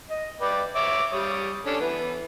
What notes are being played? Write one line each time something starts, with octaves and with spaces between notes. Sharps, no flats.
D#5
B4 D5 G5
C#5 E5 D6
G3 C#5 D#6
C#4 D4 A4
E3 B3